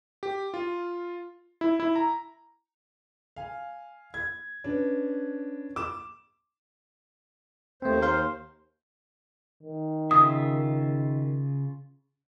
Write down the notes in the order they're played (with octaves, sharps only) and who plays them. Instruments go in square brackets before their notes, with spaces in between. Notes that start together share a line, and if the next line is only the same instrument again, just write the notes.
[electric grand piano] G4
F4
E4
E4
A#5
[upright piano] F5 G#5
G#6
C#4 D4 B4
D6 E7
[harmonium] D#2 C5 [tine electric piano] A3 C4
[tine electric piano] A#4 F5 C6
[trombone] D#3
[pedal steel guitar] C#3 F4 E5 [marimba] D#6